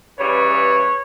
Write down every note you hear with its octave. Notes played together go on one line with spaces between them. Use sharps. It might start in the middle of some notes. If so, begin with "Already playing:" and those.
C#3 E3 G3 B4 C#5